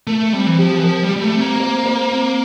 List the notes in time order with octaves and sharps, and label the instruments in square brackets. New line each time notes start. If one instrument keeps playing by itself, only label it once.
[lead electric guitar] A3 [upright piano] A#4
[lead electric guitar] G3 [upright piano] C4
[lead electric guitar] E3
[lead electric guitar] F3 [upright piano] G4
[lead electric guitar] E3
[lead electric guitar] F3 [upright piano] A#4
[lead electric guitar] G3
[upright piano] G4
[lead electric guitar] G3
A3
[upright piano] C4
[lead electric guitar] A#3
[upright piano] C5
C5
C4